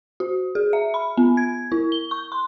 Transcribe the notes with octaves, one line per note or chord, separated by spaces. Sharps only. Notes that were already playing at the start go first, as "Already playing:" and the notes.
F#4
G#4
E5
B5
B3
G#6
E4
G7
C#6
C6